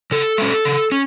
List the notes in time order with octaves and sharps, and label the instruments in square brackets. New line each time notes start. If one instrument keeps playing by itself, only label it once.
[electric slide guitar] C#3 A4
G#3 C#4
C#3
C#4